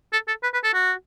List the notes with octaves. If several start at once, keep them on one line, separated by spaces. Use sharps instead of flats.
A4
A4
B4
B4
A4
F#4